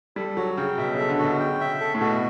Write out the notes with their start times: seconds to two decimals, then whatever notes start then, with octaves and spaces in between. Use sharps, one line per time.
0.16 G3 A4
0.37 F#3 F#4
0.57 C#3 G5
0.78 B2 E5
0.94 C#3
0.99 A4
1.09 D3
1.19 F#4
1.24 B2
1.40 C#3 G5
1.60 E5
1.80 A4
1.94 A2
2.01 B2 F#4